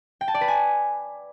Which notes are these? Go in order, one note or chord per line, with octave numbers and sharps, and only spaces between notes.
G5
A5
D5
B4
G#5